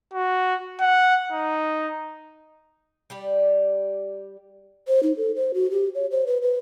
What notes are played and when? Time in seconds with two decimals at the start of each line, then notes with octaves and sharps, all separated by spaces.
0.14 F#4
0.81 F#5
1.32 D#4
3.10 G3 G4 D5
4.88 C5
5.03 D#4
5.17 A4
5.36 C5
5.54 F#4
5.71 G4
5.95 C#5
6.11 C5
6.27 B4
6.42 B4